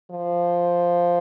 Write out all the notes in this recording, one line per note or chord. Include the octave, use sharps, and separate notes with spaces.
F3